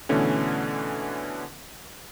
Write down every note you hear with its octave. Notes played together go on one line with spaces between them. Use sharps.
B2 D3 E3 A3 C#4